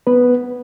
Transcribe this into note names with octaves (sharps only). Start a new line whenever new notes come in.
B3 B4